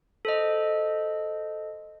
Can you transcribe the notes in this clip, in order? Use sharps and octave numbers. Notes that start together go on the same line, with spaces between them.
A4 C5 D#5